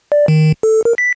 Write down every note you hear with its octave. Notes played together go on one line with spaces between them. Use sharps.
D5
D#3
A4
A#4
B6